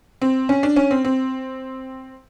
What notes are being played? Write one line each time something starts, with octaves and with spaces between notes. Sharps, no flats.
C4
C#4
D4
C#4
C4
C4